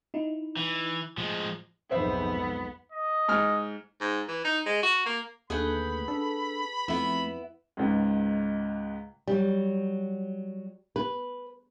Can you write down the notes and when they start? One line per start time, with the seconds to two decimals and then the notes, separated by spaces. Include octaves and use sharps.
0.14 D#4 E4
0.57 E3
1.17 A2 F3 G#3
1.91 B1 F2 G#2 B3 C5 E5
2.92 D#5
3.28 G#2 F6
4.01 G#2
4.28 E3
4.44 D#4
4.66 G#3
4.83 F#4
5.06 A#3
5.50 D#2 D3 A3 G#4 B4 F#5 B5 G6
6.08 D4 A4
6.88 F2 A3 B3 E4 B5
7.77 C#2 G#2
9.27 F#3 G3
10.96 B4